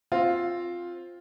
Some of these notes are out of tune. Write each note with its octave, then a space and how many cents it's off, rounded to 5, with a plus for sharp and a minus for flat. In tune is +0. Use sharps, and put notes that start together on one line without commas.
C4 +10 F4 +0